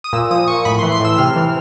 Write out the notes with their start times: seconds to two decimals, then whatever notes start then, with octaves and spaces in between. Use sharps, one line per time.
0.04 D#6
0.13 A#2 E6
0.31 F3 D#6
0.48 A#2 C#6
0.65 A2 B5
0.79 C6
0.83 E3
0.92 C6
1.00 A2 E6
1.18 C3 F6
1.36 E3